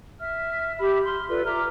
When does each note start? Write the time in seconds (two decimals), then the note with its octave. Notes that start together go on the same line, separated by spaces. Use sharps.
0.20 E5 F6
0.78 G4 E5 B5
1.06 C6 F6
1.29 F4 A4 B4 D5
1.45 E5 A#5 D6 F6